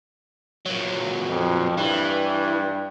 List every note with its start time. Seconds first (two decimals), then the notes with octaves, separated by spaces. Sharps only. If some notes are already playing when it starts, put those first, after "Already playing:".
0.66 A#2 F#3
1.29 F2
1.78 G2 E3